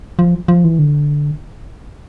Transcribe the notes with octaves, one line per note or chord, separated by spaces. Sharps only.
F3
F3
E3
D3